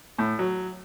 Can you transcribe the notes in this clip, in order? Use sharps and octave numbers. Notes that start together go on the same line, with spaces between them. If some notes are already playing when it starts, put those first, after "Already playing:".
A2
F#3